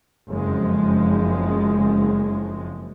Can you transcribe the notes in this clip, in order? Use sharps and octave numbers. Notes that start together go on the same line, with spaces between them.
F#1 F2 F3 G#3